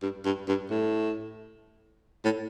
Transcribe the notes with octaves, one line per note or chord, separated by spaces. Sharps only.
G2
G2
G2
A2
A2